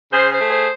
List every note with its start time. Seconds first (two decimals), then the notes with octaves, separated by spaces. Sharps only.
0.12 C#3 G#4 C5
0.30 G#4 C5
0.40 A3
0.48 G#4 C5